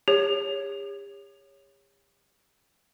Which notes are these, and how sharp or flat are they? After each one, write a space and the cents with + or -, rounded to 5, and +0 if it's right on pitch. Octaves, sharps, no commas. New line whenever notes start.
G4 +45 C#5 +0